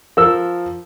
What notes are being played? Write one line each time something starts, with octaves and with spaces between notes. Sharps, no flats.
F3 A#4 E6